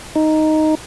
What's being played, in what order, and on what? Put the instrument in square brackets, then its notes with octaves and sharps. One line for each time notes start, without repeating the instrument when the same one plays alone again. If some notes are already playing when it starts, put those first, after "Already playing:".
[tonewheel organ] D#4